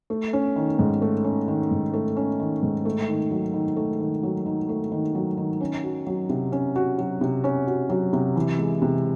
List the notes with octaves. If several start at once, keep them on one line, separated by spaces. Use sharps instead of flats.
A3
C#4
D#3
G#2
A3
C#4
D#3
G#2
A3
C#4
D#3
G#2
A3
D#3
F#3
D#3
A3
D#3
F#3
D#3
A3
D#3
F#3
D#3
C#4
F#4
F#3
C3
C#4
F#4
F#3
C3
C#4
F#4
F#3
C3
E3
G#3
C3